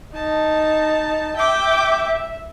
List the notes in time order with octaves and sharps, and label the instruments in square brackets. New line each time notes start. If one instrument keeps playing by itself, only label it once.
[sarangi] D#4 [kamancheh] A5
[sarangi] E5 [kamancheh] G5 D6